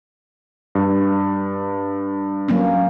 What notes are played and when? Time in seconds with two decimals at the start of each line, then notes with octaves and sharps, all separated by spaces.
0.75 G2
2.48 F#3 A#3 C#4